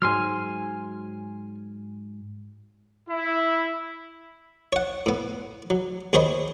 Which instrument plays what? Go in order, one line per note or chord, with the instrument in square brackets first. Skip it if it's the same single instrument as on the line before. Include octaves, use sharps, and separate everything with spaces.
[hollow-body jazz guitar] G#2 F#3 [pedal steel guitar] G#5 C6 F6
[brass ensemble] E4
[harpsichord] C#5 F#5
A2 B3
F#3
D#2 G#4 C5 C#5 D#5 B5